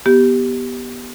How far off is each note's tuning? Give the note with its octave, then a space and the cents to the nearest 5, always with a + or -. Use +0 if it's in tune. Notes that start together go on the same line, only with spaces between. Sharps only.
B3 -15 G4 -5